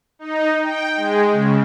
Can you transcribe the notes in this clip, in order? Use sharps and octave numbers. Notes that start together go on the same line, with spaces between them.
D#4
G5
G#3
C#3